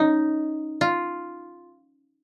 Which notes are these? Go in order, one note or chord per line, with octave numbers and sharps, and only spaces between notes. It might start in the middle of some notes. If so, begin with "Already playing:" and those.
Already playing: C#4 D#4
F4